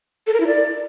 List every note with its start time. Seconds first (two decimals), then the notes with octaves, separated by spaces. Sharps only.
0.27 A4
0.34 A#4
0.40 E4
0.47 D5